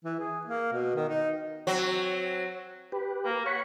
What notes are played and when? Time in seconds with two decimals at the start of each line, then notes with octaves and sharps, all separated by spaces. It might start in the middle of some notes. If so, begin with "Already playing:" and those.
0.04 E3
0.20 G#4
0.45 A#3
0.72 B2
0.95 D#3
1.09 D#4
1.67 F#3 C4
2.92 G4 B4
3.25 A#3
3.46 C#5 F#5 B5 C#6